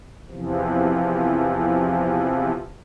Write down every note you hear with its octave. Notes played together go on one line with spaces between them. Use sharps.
E2 C3 E3 F3